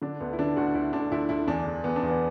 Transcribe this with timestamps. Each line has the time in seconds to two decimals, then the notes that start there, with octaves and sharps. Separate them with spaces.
0.02 D3 D4
0.20 D2 B3
0.33 E4
0.39 D3 D4
0.57 D2 F#4
0.74 D2 E4
0.93 D2 D4
1.11 D2 E4
1.29 D2 E4
1.47 E2 D4
1.66 E2
1.84 E2 B3
1.96 D4
2.02 E2
2.08 B3